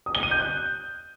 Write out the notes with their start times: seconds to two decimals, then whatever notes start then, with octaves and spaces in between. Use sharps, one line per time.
0.06 D#6
0.15 G7
0.23 D#7
0.31 G6
0.40 F#6